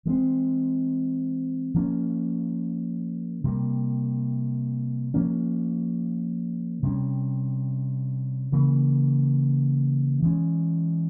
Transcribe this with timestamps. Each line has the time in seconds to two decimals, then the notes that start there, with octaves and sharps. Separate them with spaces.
0.05 E3 G#3 C4
1.74 F3 A#3 C#4
3.44 C3 G3 A#3
5.14 F3 A#3 C#4
6.83 C3 G3 A#3 C#4
8.52 C#3 E3 A#3
10.22 E3 G#3 C#4